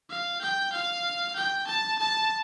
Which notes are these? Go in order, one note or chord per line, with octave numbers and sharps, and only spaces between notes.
F5
G5
F5
G5
A5
A5